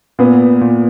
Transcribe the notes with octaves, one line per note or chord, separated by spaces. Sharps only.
A#2 B3
A#2